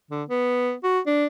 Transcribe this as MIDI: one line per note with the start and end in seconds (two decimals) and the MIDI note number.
0.11 0.23 50
0.29 0.73 59
0.84 1.00 66
1.07 1.26 62